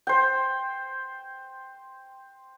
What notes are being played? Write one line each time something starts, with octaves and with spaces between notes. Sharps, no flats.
C5 G5